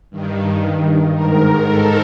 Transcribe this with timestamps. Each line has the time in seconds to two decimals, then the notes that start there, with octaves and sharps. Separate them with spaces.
0.10 G2 D#3
1.13 G#2 D#3 A#4
1.65 A4